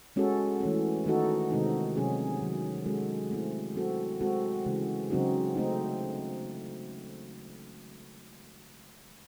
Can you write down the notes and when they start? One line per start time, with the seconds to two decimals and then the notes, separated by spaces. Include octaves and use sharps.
0.16 G#3 C#4 F#4 A4
0.61 E3 A3 C#4
1.06 D#3 A3 D#4 F#4 A4
1.51 C3 D#3 G#3 C4 D#4
1.96 C3 F#3 C#4 G#4
2.41 C3 D#3 F#3
2.86 G#3 C#4 F#4 A4
3.31 A3 C4 E4
3.76 F#3 C4 F#4 A4
4.21 G#3 C4 F#4 A4
4.65 C#3 E3 G#3
5.10 C#3 F#3 C4 D#4 F#4
5.55 A3 C4 D#4